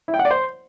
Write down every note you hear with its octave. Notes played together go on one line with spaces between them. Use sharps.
E4
G5
F#5
D5
C5